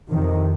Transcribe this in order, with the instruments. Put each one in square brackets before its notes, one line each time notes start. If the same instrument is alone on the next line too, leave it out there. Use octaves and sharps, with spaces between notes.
[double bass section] F2 C3 D#3